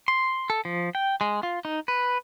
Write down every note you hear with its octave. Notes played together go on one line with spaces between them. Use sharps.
C6
A4
F3
G5
G#3
F4
D#4
B4